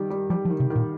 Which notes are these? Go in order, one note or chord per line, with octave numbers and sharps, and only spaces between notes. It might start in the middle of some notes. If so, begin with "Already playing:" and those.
Already playing: D#3 G3
G3
F3 G3
F3
D#3
C3
D#3
A#2